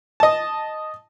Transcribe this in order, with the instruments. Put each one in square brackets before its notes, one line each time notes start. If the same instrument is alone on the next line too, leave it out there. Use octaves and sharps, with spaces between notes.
[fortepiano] D#5 A5